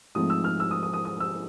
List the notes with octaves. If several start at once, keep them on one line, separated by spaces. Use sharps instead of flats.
G#2 F3 A3 C4 D#6
E6
F6
E6
D#6
D#6
D#6
D#6
E6